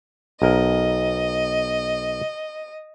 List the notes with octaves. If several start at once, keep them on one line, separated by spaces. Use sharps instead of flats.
B1 A#4 D#5